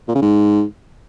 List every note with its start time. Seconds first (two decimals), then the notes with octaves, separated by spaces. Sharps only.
0.08 A#2
0.15 C#3
0.22 G#2